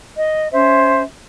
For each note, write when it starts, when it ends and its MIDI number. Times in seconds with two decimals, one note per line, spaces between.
0.16 0.49 75
0.52 1.02 61
0.52 1.02 72
0.52 1.02 76